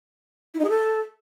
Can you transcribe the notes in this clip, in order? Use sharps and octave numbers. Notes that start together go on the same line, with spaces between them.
E4
D#4
G#4
A4